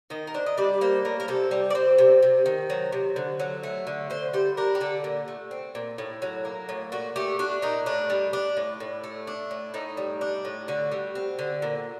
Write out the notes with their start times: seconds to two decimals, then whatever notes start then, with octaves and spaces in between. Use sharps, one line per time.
0.10 D#3 D#5
0.27 A#4
0.34 D4 C5
0.46 D#5
0.57 G3 D5
0.81 A#3 C5
1.05 A2 A#4
1.20 A#4
1.28 C3 A4
1.51 G3
1.70 D5
1.75 C4 C5
1.98 C3
2.23 C3
2.46 D#3
2.70 F#3
2.92 C3
3.16 D3
3.40 F#3
3.63 A3
3.87 D3
4.10 D3 C5
4.33 G3 C5
4.57 D4 A#4
4.75 G4
4.81 D3 A4
5.04 A#2
5.28 A3
5.51 C4
5.75 A#2
5.98 A2
6.22 F#3
6.45 A#3
6.69 A2
6.92 A#2 F#4
7.16 A3 G4
7.39 D4 F#4
7.62 A#2 D#4
7.86 A2 D4
8.10 G3
8.33 D4
8.57 A2
8.80 A2
9.04 A3
9.27 D4
9.51 A2
9.74 A2 D#4
9.97 G3
10.21 D4
10.45 A2
10.68 D3 F#4
10.92 G3
11.15 C4
11.39 D3
11.62 A#2